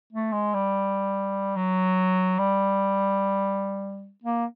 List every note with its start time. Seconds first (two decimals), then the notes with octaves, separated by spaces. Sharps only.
0.13 A3
0.33 G#3
0.54 G3
1.56 F#3
2.38 G3
4.24 A#3